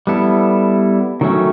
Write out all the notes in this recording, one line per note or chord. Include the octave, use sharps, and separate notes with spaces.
G3 B3 E4 A4
D#3 F#3 A3 C#4